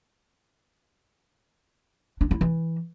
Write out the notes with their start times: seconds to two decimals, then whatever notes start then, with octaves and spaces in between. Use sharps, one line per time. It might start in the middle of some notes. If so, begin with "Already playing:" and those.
2.21 D4
2.31 E4
2.41 E3